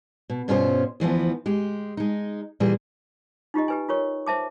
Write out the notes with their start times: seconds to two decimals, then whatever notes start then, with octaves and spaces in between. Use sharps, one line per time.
0.30 B2
0.48 G2 B2 C#4 F4 B4 C5
1.00 D2 E3 F3 B3
1.46 G#3 G4
1.97 G#3 D#4
2.60 A#2 E3 G3 G#4
3.54 D#4 F4 G4 D#5
3.68 G4 B4 G#5
3.88 F4 A#4 C#5 C#6
4.26 C5 E5 A5 D6